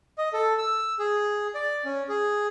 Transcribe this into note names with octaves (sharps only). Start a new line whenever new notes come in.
D#5
A4
E6
G#4
D5
C#4
G#4